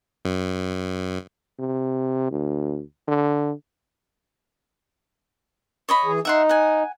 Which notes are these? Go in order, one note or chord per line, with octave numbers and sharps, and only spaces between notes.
F#2
C3
D2
D3
C#5 D#5 B5
E3 G#4
D#4 E5 F#5 C6
F#5 G#5